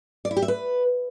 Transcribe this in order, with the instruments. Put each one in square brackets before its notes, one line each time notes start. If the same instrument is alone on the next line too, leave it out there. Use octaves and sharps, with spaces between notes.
[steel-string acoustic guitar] D5
E4
G4
E5
B4